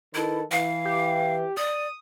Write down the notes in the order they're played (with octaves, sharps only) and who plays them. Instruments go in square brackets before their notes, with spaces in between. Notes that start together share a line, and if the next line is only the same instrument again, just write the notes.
[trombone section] D#3 A4 B4 [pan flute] E4
[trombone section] E3 [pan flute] F5
[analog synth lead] G4
[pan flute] D5 [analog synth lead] D#6